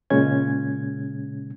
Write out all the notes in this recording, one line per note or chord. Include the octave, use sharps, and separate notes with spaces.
A#2 C#3 G#3 C#4 G#6